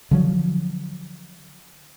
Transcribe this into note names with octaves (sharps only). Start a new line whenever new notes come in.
D3 F3 F#3